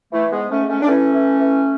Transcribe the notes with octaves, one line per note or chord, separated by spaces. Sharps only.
E3 A3
G#3 B3
G#2
A3 C#4
G#2
A3 C#4
D4
E3 A3 C#4
E3
E3